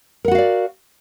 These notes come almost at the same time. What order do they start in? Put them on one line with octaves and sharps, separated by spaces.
A#4 F#5 F#4 F5 D5